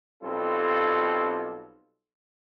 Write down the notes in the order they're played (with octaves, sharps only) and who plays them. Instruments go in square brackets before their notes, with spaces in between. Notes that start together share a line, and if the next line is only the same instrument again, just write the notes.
[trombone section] B1 G3 C4 F4 A4